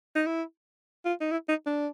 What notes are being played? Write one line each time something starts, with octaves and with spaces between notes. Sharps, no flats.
D#4
E4
F4
D#4
E4
D#4
D4